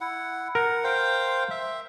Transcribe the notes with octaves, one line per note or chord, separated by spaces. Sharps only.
E4 F#5
A#4 F#5
C5 F5 G5
E5